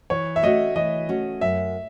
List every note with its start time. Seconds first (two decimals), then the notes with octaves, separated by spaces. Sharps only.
0.10 E3 C#5
0.36 E5
0.43 A3 C#4 F#4 D#5
0.75 E3 D#5
1.09 A3 C#4 F#4
1.41 F#2 E5